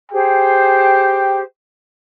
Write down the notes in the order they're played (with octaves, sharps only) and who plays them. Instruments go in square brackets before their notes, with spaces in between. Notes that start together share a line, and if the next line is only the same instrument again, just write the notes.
[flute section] G4 G#4 C5 [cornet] G5